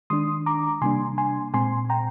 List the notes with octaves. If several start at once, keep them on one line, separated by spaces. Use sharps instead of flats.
D#3 G#3 D4 C6 D#6
A#5 D6
C3 G3 A#3 D4 G#5 C6
G#5 C6
A#2 G#3 C4 G#5 C6
G5 A#5